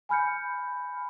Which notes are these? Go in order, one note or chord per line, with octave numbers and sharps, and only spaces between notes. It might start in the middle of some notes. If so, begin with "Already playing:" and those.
G#5 B5 F6 G6 C#7